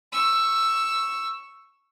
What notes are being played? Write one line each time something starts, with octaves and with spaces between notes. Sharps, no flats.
C#6 E6